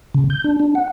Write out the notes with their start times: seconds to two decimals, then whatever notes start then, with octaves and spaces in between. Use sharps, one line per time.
0.14 C#3
0.30 G6
0.44 D4
0.60 D4
0.75 F#5